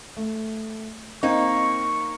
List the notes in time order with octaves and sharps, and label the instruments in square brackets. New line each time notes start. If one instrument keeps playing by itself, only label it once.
[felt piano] A3
[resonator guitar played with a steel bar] A#3 D#4 [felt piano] C4 [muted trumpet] C#6